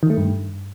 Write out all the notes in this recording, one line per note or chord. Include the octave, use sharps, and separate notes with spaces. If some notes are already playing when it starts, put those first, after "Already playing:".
D#3
A3
G2